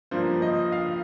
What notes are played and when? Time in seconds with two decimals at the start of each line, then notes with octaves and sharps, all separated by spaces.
0.11 G2 F3 A#3 D4 C5
0.42 D#5
0.72 F5